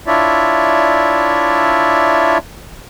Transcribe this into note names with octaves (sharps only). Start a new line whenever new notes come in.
D4 E4 F4 C#5 D5 E5